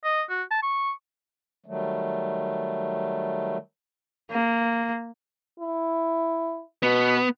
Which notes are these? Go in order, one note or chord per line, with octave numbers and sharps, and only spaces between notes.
D#5
F#4
A5
C#6
D#3 F#3 G3 A3
A#3
E4
B2 B3